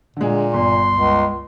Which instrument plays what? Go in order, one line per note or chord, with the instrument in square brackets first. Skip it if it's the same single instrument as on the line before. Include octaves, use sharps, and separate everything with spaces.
[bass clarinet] A#2 [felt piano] D3 G#3
[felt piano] G1 [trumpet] C6
[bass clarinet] C#2